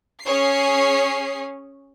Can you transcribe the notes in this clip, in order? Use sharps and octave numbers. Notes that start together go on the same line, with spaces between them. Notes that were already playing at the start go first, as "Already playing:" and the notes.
C#4 G#4 C#5 C7